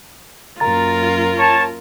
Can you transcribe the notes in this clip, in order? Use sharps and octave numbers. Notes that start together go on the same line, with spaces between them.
F#2 A#3 F4 A#4 A#5 A6
C#5 A5